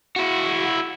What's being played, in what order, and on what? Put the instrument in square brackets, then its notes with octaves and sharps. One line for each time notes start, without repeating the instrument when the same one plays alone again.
[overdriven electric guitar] E4 F#4